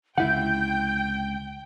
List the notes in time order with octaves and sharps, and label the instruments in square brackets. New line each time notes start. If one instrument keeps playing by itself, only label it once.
[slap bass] C#2 C3 [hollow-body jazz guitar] E4 F#5 [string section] G5 [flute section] G6